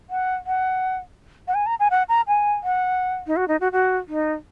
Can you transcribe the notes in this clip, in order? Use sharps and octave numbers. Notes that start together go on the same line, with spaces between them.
F#5
F#5
F#5
G#5
A#5
G#5
F#5
A#5
G#5
F#5
D#4
F#4
D#4
F#4
F#4
D#4